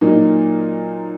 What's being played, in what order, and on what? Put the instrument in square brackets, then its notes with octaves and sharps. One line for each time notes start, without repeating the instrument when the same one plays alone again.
[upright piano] A#2 F#3 A#3 D#4